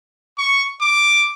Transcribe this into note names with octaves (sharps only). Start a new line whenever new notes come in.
C#6
D6